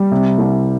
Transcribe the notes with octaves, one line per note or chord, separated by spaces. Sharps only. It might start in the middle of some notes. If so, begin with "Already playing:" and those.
Already playing: G3
C3
C2